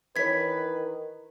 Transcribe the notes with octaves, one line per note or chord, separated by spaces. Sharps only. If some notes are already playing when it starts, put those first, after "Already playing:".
D#3 E3 B4 C#5 G#6 B6